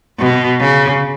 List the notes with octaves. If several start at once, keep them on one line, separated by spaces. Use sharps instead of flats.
B2
C#3